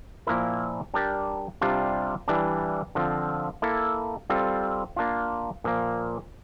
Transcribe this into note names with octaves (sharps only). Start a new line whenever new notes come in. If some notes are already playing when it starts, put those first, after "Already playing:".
A#2 F3 A#3 E4 A#4
G3 D4 G4 A#4 D5
C3 G3 D4 F4
E3 G3 D4
D3 F3 C4 F4
A#3 E4 A4
G3 C4 F4 A4
A#3 D4 F4
A#2 F3 A#3